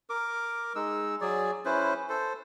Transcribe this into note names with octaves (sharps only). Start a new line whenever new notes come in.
A#4 D6
G#3 D#4 E6
F#3 G#4 D5
C#4 E4 B4 C5
A4 C5